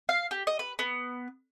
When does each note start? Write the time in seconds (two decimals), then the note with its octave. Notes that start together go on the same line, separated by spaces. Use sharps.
0.09 F5
0.31 G4
0.47 D#5
0.59 B4
0.79 B3